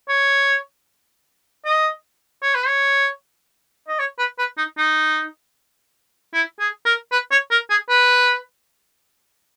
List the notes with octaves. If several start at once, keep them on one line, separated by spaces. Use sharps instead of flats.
C#5
D#5
C#5
B4
C#5
D#5
C#5
B4
B4
D#4
D#4
E4
G#4
A#4
B4
C#5
A#4
G#4
B4